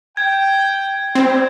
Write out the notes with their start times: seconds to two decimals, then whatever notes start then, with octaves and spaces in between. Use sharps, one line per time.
0.17 G5 G#6
1.15 G3 C4